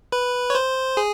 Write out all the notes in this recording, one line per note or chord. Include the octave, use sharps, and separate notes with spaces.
B4
C#5
C5
G#4